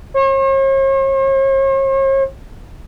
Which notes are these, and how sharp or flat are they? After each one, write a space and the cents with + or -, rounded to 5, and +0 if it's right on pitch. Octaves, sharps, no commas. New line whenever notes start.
C#5 -45